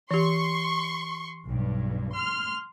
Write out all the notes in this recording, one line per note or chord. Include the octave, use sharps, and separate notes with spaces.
E3 G4 C6 C#6
B1 G2
C6 F6